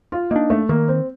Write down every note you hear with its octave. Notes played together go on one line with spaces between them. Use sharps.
F4
A#3 D4 D#4
A3
D#3 A#3
C4